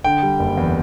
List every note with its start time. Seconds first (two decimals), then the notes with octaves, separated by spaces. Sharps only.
0.04 D3 G5
0.23 G3
0.39 F#1
0.57 E2